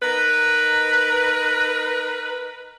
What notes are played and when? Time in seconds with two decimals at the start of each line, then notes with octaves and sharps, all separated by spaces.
0.02 D#4 A#4 B4